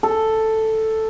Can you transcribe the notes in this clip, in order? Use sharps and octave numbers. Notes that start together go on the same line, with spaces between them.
A4